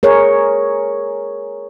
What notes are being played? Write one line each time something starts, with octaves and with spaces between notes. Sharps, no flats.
G#4 A#4 C#5